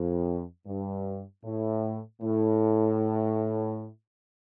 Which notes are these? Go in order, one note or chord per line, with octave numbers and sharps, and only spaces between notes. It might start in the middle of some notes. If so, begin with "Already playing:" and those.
Already playing: F2
G2
A2
A2